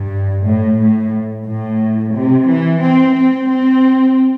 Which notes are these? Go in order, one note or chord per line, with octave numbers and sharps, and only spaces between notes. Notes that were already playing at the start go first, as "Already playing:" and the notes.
Already playing: G2
A2
A2
A2
C3
E3
C4
C4
C4